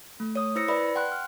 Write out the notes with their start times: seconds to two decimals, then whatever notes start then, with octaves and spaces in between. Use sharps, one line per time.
0.20 A3
0.35 C#5 D#6
0.55 E4 C5 E6 A#6 C#7
0.68 B4 D5 E5 B5
0.95 F#5 G5 C6 F#6
1.12 F6